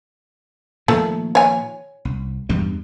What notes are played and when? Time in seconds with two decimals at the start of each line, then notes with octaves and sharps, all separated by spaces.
0.88 A#2 D#3 F3 A3 A#3
1.35 C#5 G#5
2.05 C2
2.49 E2 G2 G3